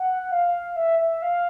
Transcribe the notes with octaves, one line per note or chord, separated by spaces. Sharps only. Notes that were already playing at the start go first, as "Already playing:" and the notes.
Already playing: F#5
F5
E5
E5
F5